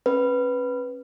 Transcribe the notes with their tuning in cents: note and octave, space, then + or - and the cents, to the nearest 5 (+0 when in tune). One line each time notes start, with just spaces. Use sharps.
C#4 -25 B4 +0